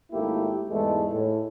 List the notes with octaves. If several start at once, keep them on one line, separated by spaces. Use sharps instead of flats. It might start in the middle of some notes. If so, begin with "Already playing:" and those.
G#1 A3 A#3 E4 G4
E2 G#2 G#3 A3
A2